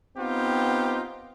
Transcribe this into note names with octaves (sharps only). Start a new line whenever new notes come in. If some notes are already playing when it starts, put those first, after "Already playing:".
B3 C4 D#4 F4 G4